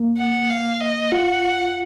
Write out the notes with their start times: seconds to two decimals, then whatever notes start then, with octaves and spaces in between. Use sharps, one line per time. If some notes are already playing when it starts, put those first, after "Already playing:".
Already playing: A#3
0.17 F#5
0.50 F5
0.81 D#5
1.12 F4 F#5